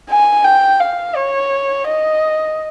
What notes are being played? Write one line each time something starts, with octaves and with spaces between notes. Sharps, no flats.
G#5
G5
F5
C#5
D#5